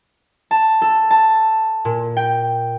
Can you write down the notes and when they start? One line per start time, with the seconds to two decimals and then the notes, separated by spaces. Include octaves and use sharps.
0.51 A5
0.82 A4
1.11 A5
1.85 A#2
2.17 G5